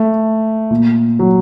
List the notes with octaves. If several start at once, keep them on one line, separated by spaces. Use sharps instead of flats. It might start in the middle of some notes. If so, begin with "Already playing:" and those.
Already playing: A3
A#2
F#3